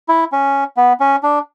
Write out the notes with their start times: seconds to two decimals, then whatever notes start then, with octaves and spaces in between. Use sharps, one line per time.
0.08 E4
0.32 C#4
0.77 B3
1.00 C#4
1.23 D4